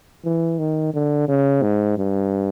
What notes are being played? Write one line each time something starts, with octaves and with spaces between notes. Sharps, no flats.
E3
D#3
D3
C#3
G#2
G2